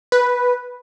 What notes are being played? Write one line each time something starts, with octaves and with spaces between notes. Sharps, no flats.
B4